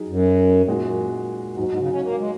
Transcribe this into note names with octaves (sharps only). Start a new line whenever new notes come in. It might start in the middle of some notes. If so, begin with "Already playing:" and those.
Already playing: F#3 D#4 G#4
F#2
A#2 G#3 D#4 F#4
G#2 F#3 D#4 F#4
G#2
C#3
C#4
A#3
G#3